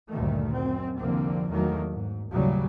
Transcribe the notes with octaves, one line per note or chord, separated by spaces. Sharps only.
D2 G2 A#2 D#3 A3
F#2 C4
C2 F2 D3 A#3 C4
E2 D#3 F#3 A3 A#3
G#2
F#1 D#2 A2 C#3 F#3 G3